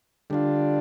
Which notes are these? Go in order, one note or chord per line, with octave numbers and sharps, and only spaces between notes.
D3 G3 D4 F4